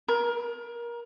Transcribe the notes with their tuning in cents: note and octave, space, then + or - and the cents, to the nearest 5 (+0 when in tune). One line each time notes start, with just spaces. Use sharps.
A#4 +25